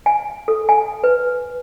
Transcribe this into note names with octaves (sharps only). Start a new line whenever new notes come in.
G#5
A4
G#5
B4